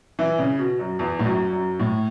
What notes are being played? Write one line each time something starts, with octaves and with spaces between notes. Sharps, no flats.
E3
C#3
B2
F#2
E2
A2
F#2
F#2
A2